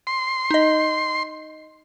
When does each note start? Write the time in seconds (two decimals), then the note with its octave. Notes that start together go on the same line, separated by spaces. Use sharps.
0.07 C6
0.51 D#4 D#5